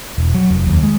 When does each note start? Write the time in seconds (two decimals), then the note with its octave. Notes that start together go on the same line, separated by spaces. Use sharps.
0.18 E1
0.35 F#3
0.50 F1
0.67 D#2
0.83 G#3